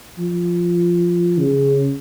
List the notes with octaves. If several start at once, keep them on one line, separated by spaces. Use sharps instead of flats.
F3
C#3